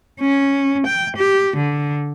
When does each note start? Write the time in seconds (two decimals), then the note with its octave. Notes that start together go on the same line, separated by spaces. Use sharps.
0.20 C#4
0.87 G5
1.17 G4
1.57 D3